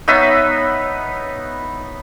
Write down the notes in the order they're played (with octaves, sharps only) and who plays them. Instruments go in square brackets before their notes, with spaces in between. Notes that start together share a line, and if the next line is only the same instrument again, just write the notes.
[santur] B3 D#4 C#5 E5